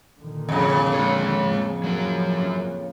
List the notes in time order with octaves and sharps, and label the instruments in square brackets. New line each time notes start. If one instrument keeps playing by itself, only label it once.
[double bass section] A#2 D3 D#3
[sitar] F2 C#3
[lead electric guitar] G#3 C#5
[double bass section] A2 F3 A#3
[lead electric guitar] F#3 A#4